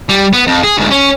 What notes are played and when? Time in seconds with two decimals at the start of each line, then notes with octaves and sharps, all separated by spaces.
0.09 G3
0.33 B3
0.47 F2
0.64 G#4
0.77 D2 G#2
0.91 C#4